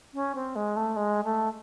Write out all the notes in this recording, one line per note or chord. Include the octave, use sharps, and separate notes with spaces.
C#4
C4
G#3
A3
G#3
A3